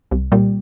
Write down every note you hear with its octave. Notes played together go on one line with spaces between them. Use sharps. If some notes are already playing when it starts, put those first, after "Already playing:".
C2
A#2 G3